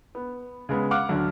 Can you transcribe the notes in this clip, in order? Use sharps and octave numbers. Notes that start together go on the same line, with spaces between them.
B3
C#3 G#3 B3
F5 F#5 D6 F6 F#6
D2 D3 F#3